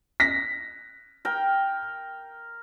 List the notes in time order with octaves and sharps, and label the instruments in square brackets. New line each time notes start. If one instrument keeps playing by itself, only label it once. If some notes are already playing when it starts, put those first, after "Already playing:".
[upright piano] A#6 B6
[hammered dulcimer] A#4 G5